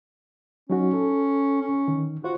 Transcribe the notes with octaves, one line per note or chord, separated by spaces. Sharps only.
F#3 C#4 D#4 F#4
A4
C#4
D#3
F4 F#4 C5